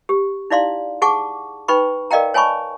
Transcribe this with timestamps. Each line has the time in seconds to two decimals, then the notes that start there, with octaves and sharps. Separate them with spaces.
0.09 G4
0.50 D#4 E4 D5 F5 C6
1.02 G#4 F#5 A5 C#6 D6
1.68 D#4 B4 G5 B5 C#6
2.11 A#4 D5 D#5 F5 G5 A#5
2.34 C#5 G#5 A5 B5 C#6